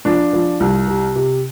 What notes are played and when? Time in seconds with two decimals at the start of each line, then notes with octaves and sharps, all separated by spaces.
0.05 F3 D4
0.33 F3
0.60 C2
0.87 C3
1.16 C3